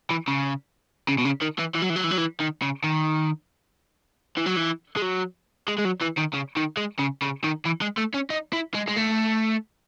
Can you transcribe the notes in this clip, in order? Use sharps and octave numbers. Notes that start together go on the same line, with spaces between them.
E3
C#3
C#3
B2
C#3
D#3
E3
E3
F#3
E3
F#3
E3
F#3
E3
D#3
C#3
D#3
E3
F#3
E3
G#3
F#3
G#3
G#3
F#3
E3
D#3
C#3
D#3
G#3
C#3
C#3
D#3
E3
G#3
A3
C#4
D#4
E4
G#3
G#3
A3